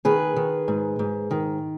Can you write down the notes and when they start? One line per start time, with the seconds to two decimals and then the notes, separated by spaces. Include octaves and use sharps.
0.05 D#3 G#4 B4
0.36 D#3
0.68 G#2
0.99 G#2
1.31 D#3